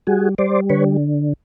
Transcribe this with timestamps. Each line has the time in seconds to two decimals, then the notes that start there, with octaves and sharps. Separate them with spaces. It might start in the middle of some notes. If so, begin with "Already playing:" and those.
0.07 G3 F#4 G#4
0.38 G3 C5 D5
0.70 D3 B4 C#5